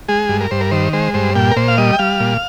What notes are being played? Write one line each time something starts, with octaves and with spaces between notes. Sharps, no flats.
G#3 G#4
G2
A#4
G2 C5
A#4
D#3 C5
G#3 C5
G2 C5
A#2 G5
A#4
A#2 C5
F5
G3 D#5
G5
G3 F5
A#2